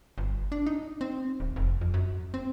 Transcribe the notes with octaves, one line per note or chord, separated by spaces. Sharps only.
G1
D4
D#4
C4
D1
F1
F2
F#2
C4